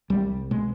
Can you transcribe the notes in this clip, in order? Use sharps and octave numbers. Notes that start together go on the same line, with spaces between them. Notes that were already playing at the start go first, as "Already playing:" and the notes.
C2 G3
B2 G#3